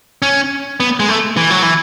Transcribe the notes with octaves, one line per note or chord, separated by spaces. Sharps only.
C#4
B3
G#3
A3
E3
F#3
E3